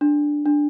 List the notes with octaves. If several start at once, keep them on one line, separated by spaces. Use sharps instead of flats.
D4
D4